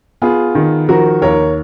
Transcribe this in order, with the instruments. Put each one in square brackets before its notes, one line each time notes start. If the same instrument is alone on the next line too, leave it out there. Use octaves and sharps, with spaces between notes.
[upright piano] B3 [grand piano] F4 G#4
[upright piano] D#3
[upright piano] F3 [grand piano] F#4 A#4
[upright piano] D#2 [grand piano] A#4 C#5